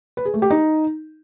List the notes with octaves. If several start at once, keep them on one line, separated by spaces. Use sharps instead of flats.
B4
G#4
A3
G4
D#4